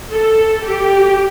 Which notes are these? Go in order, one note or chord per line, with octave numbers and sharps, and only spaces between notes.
A4
G4